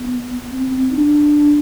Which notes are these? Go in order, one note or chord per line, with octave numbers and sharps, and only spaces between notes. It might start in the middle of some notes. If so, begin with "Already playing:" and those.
Already playing: B3
C4
C4
D#4
D4